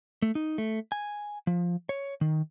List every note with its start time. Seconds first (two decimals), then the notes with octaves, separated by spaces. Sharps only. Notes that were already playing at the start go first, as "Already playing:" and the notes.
0.22 A3
0.35 D#4
0.58 A3
0.92 G#5
1.47 F3
1.89 C#5
2.21 D#3